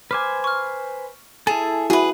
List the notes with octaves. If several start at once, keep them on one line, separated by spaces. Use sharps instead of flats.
B4 C5 G#5 D6 F6
C#6 F6
E4 G#4 A4 G#5 A5
E4 F#4 G#4 B4